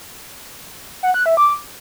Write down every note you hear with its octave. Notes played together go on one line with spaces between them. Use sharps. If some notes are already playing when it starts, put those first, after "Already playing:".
F#5
F#6
E5
D6